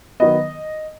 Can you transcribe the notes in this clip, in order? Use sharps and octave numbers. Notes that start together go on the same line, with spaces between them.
D#3 F#3 B3 D#5